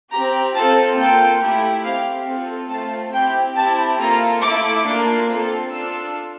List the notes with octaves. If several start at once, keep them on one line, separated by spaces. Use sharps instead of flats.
C4 G4 A#5
C4 F4 A4 A5
A#3 F4 A4 G5
A3 E4 G4
C4 G4 F5
C4 F4 A4
A3 C4 F4 A5
C4 E4 G4 G5
C4 E4 G4 A5
A#3 F4 A4 A#5
A3 E4 A4 D6
A#3 D4 F4
C4 F4 A4
D4 F4 A4 E6